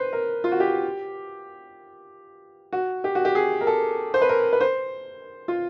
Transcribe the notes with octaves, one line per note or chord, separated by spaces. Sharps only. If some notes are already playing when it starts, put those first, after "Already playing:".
Already playing: B4 C5
A#4
F4
F#4
G4
F#4
G4
F#4
G4
G#4
A#4
A4
C5
B4
A#4
B4
C5
F4